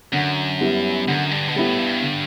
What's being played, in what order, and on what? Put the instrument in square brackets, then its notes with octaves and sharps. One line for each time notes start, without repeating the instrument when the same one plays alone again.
[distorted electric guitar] F#2 [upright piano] D3
[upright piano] G3 B3 E4
[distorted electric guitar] F#2 [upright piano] D3
[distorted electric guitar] G2
B2
[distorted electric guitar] A2 [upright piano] G3 B3 E4
[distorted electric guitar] G2
[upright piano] D3